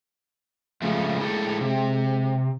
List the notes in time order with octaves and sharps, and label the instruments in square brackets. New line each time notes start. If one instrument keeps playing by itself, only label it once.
[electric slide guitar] C#3 F3 A3 [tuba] G#3
[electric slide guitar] E4 G4 A4
C3